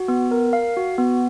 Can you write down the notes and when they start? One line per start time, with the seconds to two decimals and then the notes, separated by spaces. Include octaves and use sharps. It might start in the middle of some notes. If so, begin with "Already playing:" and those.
Already playing: F#4
0.08 B3
0.31 A#4
0.53 F5
0.77 F#4
0.98 B3